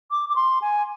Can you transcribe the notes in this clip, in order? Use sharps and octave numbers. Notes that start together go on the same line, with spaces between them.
D6
D6
C6
G#5